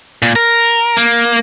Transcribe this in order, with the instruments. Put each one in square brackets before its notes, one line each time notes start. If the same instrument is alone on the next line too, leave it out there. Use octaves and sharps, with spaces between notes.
[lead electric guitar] A#2
A#4
A#3